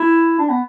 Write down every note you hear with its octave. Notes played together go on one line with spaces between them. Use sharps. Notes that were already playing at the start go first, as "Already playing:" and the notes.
Already playing: E4
D4
B3